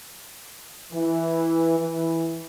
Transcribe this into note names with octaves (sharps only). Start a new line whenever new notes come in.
E3
E3